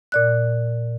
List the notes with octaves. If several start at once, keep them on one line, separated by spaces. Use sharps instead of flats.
A#2 D5 F#6